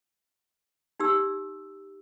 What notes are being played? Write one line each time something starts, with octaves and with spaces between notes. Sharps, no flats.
D#4 G4 E6